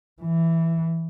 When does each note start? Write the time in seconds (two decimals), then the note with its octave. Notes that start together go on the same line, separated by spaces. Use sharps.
0.22 E3